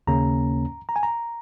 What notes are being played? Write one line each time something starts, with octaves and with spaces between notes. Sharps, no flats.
D#2 C#3 A#3 C#4 A#5
A#5
G#5
A#5